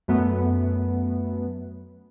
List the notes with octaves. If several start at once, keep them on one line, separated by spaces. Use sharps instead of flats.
F#2 A3 B3